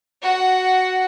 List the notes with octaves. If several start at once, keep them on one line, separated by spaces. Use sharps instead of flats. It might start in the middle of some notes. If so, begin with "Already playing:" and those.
F#4 F#5